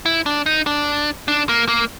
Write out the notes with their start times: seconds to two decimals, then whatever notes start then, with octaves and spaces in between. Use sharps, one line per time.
0.06 E4
0.26 D4
0.46 D#4
0.67 D4
1.28 D4
1.49 A#3
1.68 A#3